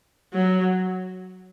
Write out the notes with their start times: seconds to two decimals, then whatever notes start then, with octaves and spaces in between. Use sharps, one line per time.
0.34 F#3